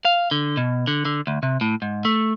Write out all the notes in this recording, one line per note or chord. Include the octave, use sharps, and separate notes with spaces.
F5
D3
B2
D3
D3
D2
C3
A2
G#2
A3